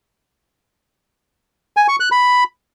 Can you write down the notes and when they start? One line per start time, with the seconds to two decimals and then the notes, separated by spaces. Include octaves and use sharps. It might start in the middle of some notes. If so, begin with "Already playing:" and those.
1.77 G#5
1.88 C#6
2.00 F#6
2.12 B5